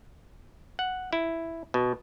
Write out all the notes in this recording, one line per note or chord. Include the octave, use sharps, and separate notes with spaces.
F#5
E4
B2